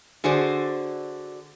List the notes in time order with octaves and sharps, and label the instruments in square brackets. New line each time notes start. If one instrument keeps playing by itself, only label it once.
[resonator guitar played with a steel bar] D3 F#4 G#4 C5 D5